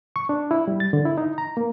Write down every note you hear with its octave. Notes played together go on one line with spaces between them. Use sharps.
C#6
D4
E4
G3
A6
D3
E4
D#4
A#5
A#3